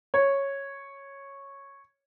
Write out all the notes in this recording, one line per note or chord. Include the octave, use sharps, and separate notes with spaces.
C#5